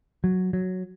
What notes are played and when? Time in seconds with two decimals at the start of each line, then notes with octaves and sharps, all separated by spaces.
0.24 F#3
0.53 F#3